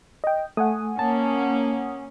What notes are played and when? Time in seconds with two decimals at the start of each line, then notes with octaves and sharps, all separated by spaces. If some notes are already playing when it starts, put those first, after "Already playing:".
0.24 D#5 G5
0.57 A3 F#5 G#5 D#6
0.99 A#3 C#4 A5